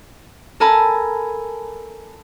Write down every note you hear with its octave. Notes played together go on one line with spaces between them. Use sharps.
A4 A#4 G#5 A5 B5